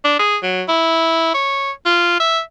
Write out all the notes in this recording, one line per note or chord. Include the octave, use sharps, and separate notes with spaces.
D4
G#4
F#3
E4
C#5
F4
E5